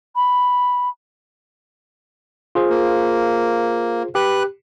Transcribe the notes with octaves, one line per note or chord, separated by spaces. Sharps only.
B5
F4 G#4 C5
A#3
G4 B4 F#6